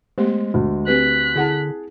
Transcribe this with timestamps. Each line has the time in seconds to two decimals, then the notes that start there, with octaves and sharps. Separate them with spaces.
0.18 G#3 A3 B3 G4 C5
0.54 D2
0.87 C4 G4 B4 F#6 B6
1.36 D3 E4 G#4 F#5 A5